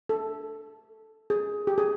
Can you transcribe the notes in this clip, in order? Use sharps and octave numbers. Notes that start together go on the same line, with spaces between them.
A4
G#4
G4
G#4